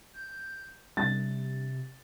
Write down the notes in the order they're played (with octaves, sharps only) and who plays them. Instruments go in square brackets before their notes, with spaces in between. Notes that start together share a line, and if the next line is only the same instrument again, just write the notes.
[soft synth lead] G6
[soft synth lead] C3 [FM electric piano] G3 D4 [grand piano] A6